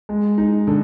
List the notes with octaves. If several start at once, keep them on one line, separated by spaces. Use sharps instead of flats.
G#3
D#4
D3